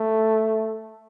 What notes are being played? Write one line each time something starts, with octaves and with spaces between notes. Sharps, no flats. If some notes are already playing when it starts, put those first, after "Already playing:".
Already playing: A3